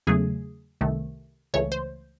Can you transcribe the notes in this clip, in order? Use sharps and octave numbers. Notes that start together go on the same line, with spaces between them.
E2 C#3 F#3 A3 G#4
C2 C3 D#3 A3
C#2 C#3 E3 A3 C#5
C5